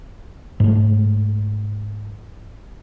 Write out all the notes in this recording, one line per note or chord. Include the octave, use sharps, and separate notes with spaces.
G#2 A3